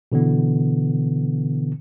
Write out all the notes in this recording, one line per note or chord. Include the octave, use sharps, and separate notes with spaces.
B2 D3 E3 B3